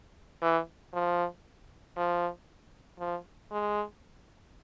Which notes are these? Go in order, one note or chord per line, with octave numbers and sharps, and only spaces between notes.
E3
F3
F3
F3
G#3